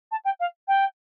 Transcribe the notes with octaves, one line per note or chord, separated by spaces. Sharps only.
A5
G5
F5
G5